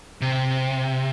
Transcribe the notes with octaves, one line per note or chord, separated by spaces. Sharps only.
C3